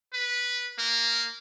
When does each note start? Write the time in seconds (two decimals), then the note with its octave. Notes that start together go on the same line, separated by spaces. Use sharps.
0.13 B4
0.79 A#3